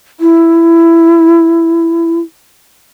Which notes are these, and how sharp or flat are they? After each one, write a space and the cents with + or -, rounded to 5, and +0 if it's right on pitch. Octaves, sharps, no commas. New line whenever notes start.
E4 +15